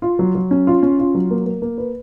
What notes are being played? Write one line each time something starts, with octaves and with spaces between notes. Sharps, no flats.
F4
F#3
F#3
C#4
F4
C#4
F4
F#3
A#3
A#3
A#3
B4